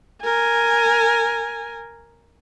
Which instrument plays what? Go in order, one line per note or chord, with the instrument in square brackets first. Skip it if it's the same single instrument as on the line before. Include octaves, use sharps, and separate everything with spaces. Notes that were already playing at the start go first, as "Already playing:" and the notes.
[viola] A#4 G#5